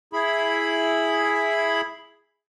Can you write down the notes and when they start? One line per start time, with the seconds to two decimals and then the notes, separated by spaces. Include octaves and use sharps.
0.13 E4 G#4 B5